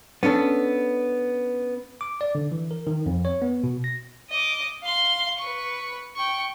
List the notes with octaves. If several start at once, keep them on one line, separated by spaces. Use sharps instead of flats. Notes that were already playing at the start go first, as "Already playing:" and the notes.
B3 C#4 D4 A4
D6
D5
D3
E3
A#4
D#3
F2
C#5
B3
B2
A#6
D#5 D6
F5 C6
B4 C#6
G5 C#6